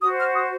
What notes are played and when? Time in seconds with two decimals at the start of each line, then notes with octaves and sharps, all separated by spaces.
0.02 F#4 C5 D#6
0.19 F6
0.35 D#6